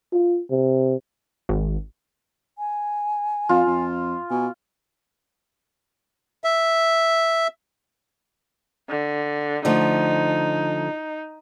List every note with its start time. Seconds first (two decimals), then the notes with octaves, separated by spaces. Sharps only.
0.13 F4
0.51 C3
1.49 G#1
2.58 G#5
3.49 F2 F4
3.67 F2
4.30 B2 G#5
6.44 E5
8.89 D3
9.65 D3 F3 A3 D#4